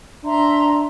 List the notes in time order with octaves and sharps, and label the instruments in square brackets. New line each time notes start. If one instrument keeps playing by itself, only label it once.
[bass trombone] D4 [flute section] E5 A#5 C6